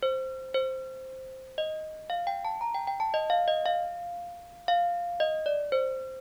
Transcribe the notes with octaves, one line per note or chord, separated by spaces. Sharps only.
C5
C5
D#5
F5
G5
A5
A#5
G5
G5
A5
D#5
F5
D#5
F5
F5
D#5
D5
C5